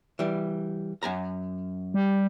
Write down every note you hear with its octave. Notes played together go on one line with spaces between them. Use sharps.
E3 G3
F#2 G#5 A#5
G3